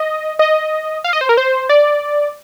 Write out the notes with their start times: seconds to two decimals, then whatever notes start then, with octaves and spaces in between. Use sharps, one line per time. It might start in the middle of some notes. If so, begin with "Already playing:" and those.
Already playing: D#5
0.39 D#5
1.04 F5
1.13 D#5
1.21 C5
1.29 A#4
1.37 C5
1.69 D5